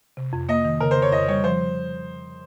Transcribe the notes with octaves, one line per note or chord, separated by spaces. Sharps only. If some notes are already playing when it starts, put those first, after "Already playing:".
C3
F2
A#3 D#5
D#3
C#3 A#4
C5
F2
C#5
F2 D#5
G3 C#5
F3 C5